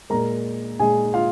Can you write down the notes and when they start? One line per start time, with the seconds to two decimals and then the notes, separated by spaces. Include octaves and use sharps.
0.10 A#2 G#3 A#4 A#5
0.79 A#2 G#3 G#4 G#5
1.14 F4 F5